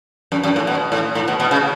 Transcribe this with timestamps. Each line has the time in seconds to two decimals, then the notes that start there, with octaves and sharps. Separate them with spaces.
0.32 F#2
0.43 F#2
0.56 A2
0.67 B2
0.92 A2
1.15 A2
1.28 B2
1.40 B2
1.51 C#3